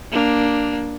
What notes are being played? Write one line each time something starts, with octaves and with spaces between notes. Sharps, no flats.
A#3 D4